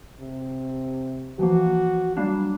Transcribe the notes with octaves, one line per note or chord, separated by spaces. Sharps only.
C3
E3 F3 A#3 F#4
F#3 G3 A#3 D4